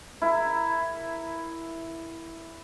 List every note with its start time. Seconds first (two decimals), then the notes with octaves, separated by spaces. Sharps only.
0.22 E4 A#4